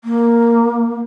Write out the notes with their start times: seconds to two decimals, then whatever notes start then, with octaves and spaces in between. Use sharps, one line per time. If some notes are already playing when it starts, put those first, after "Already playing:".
0.04 A#3